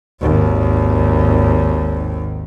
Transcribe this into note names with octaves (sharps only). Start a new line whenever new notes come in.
G#1 D#2